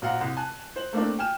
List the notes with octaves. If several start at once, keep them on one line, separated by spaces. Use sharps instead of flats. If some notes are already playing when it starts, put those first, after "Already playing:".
A#1 F#4 F5 F#5 A#5
C2
G#5 A5 F#6
C5 F#7
A3 A#3 C4 D4
G5 G#5 F6 E7